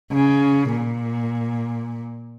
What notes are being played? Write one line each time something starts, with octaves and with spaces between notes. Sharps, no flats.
C#3
A#2